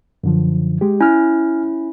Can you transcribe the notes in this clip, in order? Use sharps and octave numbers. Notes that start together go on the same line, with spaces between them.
F#2 D3 F3
G#3 G4
C#4 E4 G#5 F6